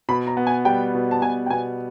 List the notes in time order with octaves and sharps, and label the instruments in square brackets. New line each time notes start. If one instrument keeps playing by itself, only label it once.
[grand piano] B2 [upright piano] B5
[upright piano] A#5
[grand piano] B3
[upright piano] G#5
[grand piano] G3 [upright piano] G5
[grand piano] B2
[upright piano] A5
[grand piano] B2 [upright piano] G#5
[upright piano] G5
[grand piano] B2 [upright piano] G#5